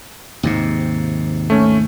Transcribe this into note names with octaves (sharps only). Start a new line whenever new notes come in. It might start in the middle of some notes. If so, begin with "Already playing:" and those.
D#2 G#2 C3
A3 C#4